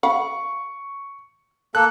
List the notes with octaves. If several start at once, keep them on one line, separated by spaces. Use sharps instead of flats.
F5 F#5 B5 C#6
A#3 A4 F#6